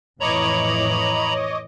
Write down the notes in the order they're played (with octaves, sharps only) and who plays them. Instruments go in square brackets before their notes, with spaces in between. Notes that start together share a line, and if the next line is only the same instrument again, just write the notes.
[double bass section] F2 A2 E3 [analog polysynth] C#5 D#5 D6 [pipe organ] A#5 B5